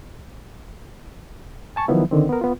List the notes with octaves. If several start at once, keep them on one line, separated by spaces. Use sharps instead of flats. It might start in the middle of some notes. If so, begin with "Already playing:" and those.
G#5 A5 C#6
D#3 F3 F#3 B3 E4
D3 D#3 C4
B3 A#4
B3 F4